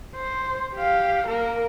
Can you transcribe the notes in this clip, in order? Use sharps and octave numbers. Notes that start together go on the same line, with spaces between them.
C5
G4 F5
A#3 A#4